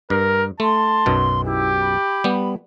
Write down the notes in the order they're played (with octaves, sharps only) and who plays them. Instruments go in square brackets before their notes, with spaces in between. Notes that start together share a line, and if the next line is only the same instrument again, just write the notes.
[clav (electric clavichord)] G2 [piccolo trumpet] A#4
[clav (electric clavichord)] A3 [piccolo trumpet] A5 [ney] C6
[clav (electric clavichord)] B1 F#2 B2
[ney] E4 [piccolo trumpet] G4
[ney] B5
[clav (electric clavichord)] G3 B3